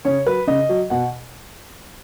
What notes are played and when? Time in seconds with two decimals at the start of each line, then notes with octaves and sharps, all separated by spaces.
0.05 C#3 C#5
0.27 F#3 B4
0.47 C#3 D#5
0.69 F#3
0.90 B2 F#5